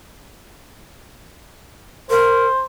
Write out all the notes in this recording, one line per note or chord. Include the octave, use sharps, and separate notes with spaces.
A#4 C5